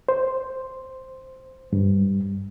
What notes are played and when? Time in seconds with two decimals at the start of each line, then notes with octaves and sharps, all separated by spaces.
0.09 C5
1.73 G2